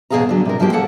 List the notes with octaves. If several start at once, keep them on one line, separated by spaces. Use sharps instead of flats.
E2 B2 C#4 G#4 F5 A#5
D3 F#3
C3 A#4
G2 F3 F#3 G#3 A#3 G4
D#2 A#3 A4 F#5 A5